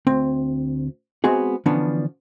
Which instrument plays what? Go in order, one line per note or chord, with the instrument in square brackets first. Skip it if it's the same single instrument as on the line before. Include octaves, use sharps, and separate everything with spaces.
[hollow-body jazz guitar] D2 C4
G#3 B3 C4 F#4 G#4
D3 E3 F3 B3 C#4 D4